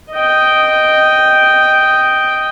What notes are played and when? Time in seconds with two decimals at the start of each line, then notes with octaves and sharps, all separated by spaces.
0.12 D#5 G5